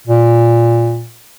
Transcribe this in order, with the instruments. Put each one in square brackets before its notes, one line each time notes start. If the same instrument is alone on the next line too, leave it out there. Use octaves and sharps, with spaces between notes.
[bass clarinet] A#2